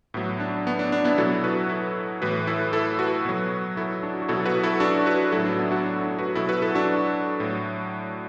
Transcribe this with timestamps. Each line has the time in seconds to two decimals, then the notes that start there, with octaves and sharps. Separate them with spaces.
0.14 A2 F#3 B3
0.40 D4
0.67 B3
0.79 D4
0.92 D4
1.04 B3 E4
1.18 B2 F#3 E4 A4
1.44 F#4 B4
1.69 E4 A4
2.21 A2 E3 F#4 B4
2.47 E4 A4
2.73 E4 A4
2.99 F#4 B4
3.25 B2 F#3
3.77 E4 A4
4.03 D4 F#4
4.22 F#4
4.28 B2 F#3 E4 A4
4.46 F#4 B4
4.63 E4 A4
4.80 D4 F#4
5.06 F#4 B4
5.32 A2 F#3 E4 A4
5.45 D4 F#4
5.58 B3 E4
5.71 D4 F#4
5.84 D4
6.02 D4
6.18 F#4 B4
6.35 B2 F#3 E4 A4
6.49 F#4 B4
6.62 E4 A4
6.75 D4 F#4
7.40 A2 F#3